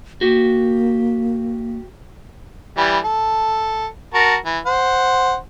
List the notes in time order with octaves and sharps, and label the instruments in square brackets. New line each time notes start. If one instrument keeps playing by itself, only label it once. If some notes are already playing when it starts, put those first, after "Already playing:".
[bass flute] A#3 [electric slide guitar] F#4 G4
[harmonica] E3 G3
A4
F#4 A#4 A5
E3
C5 F#5